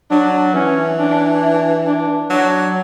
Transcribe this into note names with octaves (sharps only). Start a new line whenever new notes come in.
F#3 D4
E3 C#4
D4
D4
D4
F#3 D4